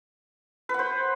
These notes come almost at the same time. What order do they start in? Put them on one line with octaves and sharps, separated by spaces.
B4 F#5 C5